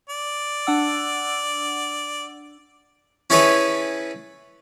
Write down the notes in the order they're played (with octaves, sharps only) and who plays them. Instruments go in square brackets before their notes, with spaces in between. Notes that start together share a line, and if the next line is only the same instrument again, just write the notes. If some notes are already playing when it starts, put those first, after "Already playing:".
[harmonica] D5
[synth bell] D4 F#5 E6
[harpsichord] C#4 E4 G#4 A4 B4 C#5